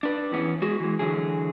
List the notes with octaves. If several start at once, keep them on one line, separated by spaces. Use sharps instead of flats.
D4 B4
E2 E3 B3 C#4
G#3 F#4 G#4
E3 G#3
D3 E3 F#3 G#4